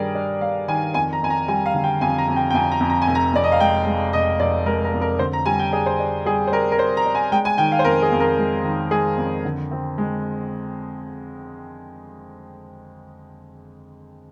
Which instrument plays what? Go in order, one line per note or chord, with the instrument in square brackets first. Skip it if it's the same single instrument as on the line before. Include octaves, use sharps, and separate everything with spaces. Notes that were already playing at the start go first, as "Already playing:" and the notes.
Already playing: [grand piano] G2 D#3 G3 G#4 A#4 D5
D4
D4 F5
D#3 G#5
F2 G#5
A#5
F2 G#5
A#5
G3 G#5
F5
D3
G5
F2 G#5
A#5
F2
G5
G5
F2 G#5
A#5
F2
A#5
G#5
F1
A#5
F2 D5
D#5
F5
G#3 G5
G#3
F1 D#5
F1 D5
G#3 A#4
A#4
F2
A#4
D3 C5
A#5
G3 G#5
G5
D4 G#4
C5
D4
G3 G#4
C5
D4 A#4
A#4
D4 C5
A#5
D4
G#5
G#3 G5
G#5
D#3 G5
F5
C5
F2 A#4
G#4
F2
A#4
G#3
D#3
G#3 G#4
F2
D3
C4
G#3